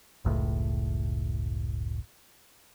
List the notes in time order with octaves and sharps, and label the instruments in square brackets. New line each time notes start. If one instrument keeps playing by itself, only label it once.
[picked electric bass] F#1 C#2 A2